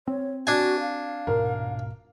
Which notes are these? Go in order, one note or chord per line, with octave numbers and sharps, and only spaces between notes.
C4 C#5
D4 F#4 G#5
F5
D#1 G#2 B2 A#4